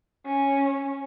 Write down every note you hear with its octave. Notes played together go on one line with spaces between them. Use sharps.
C#4